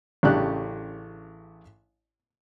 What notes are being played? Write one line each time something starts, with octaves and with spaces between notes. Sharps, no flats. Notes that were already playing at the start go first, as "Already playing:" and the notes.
A1 C#3 D4 G4 F#6